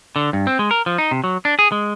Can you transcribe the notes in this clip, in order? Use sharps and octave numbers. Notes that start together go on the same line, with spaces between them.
D3
G2
C4
G#3
A#4
F3
D#4
C3
F#3
D4
G#4
G#3